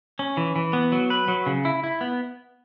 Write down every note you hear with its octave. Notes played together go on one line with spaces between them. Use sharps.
C#4
E3
E3
B3
F#3
B4
F#3
C#3
E4
E4
B3